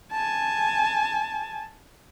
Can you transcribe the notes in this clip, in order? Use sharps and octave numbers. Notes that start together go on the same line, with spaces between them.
G#5 A5